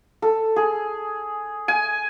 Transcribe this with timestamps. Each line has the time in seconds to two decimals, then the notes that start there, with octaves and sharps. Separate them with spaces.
0.22 A4
0.56 G#4
1.68 G#5